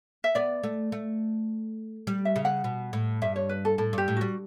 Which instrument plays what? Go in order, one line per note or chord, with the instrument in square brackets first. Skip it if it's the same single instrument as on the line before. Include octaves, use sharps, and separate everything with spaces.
[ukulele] E5
[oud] B3 [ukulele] D5
[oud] A3
A3
G3
[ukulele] E5
[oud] C#3
[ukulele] F#5
[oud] B2
A2
[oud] G2 [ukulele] E5
[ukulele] C#5
B4
A4
[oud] A2 [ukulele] A4
[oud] G2 [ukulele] G4
[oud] A2
[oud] G3 [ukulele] F#4